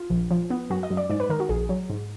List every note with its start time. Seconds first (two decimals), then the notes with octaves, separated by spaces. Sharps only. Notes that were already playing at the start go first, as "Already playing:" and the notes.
Already playing: F4
0.10 A#1
0.31 F3
0.50 B3
0.70 F#2 F#4
0.83 D#5
0.90 F#2
0.97 D5
1.10 G#2 D5
1.20 B4
1.30 D#3 A#4
1.40 F#4
1.49 A#1 G#4
1.69 F#3
1.90 G#2